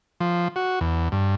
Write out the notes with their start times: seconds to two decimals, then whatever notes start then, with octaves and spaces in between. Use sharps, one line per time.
0.21 F3
0.56 F#4
0.81 E2
1.12 G2